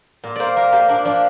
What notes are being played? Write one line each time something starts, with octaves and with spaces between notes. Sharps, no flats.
A#2
A#3 C5 D5
A#3 A#4
A#3 G4
A#3 D4
F3 D4